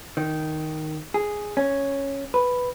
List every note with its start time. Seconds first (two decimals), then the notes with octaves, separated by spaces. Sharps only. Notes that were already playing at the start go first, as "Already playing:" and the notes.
0.17 D#3
1.14 G#4
1.57 C#4
2.34 B4